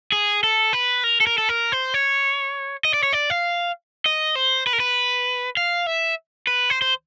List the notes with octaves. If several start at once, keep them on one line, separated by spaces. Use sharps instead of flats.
G#4
A4
B4
A#4
A4
A#4
A4
A#4
C5
C#5
D#5
D5
C#5
D5
F5
D#5
C5
B4
A#4
B4
F5
E5
B4
C5
C5